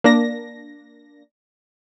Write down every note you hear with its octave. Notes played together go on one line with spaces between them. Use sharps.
A#3 D4 A#6